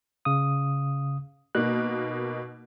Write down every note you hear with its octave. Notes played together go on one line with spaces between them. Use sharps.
C#3 F5 D#6
B2 A#3 D#4 F#6